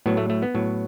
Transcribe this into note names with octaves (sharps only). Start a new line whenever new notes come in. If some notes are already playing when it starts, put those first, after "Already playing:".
A2 F#3 B3
A3
A3
B3
A2 F#3